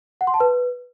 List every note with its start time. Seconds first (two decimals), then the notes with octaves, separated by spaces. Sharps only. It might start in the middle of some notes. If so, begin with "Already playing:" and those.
0.21 F#5
0.27 C6
0.34 A5
0.40 B4